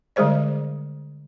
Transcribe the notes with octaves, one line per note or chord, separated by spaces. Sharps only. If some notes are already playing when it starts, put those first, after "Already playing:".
D3 G3 G#3 G#4 C5 D5